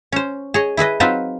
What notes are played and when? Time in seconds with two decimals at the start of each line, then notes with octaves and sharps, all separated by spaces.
0.12 C#4 C5
0.54 G#4 C#5 D#5
0.77 E4 G#4 B4 D#5
1.00 F#3 C4 D#4 F4 B4 C5